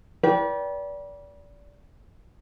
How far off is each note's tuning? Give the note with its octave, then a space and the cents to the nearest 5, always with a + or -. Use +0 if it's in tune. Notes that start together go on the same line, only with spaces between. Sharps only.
B4 -35 D5 -25 G5 +0